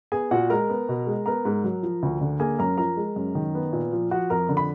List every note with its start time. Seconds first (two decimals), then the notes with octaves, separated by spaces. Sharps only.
0.12 B3 G#4 G#5
0.31 A#2 F#4 F#5
0.50 G#3 A#4 A#5
0.70 B3
0.89 B2
1.07 G#3
1.26 B3 A#4 A#5
1.45 G#2
1.64 F#3
1.83 F3
2.03 D2
2.21 D3
2.40 A#3 G#4 G#5
2.59 F#2 A#4 A#5
2.78 F3 A#4 A#5
2.97 G#3
3.16 F#2
3.35 D#3
3.55 B3
3.73 A#2
3.93 F3
4.11 F3 F#4 F#5
4.30 F2 A#4 A#5
4.49 D3
4.57 B5